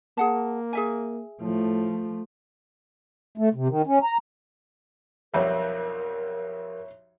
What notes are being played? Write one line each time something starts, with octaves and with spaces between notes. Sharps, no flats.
A#3 G#4 F#5 A5
G#4 E5 G#5
A2 F3 A3
A3
C3
D#3
C#4
A#5
B1 F2 G3 A#4 C#5 E5